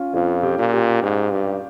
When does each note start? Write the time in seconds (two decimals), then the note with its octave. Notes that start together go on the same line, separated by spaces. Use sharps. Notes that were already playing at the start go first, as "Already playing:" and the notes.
Already playing: C#4 F4
0.14 F2 F4
0.43 G4
0.58 A#2
0.73 G4
1.03 G#2
1.32 G2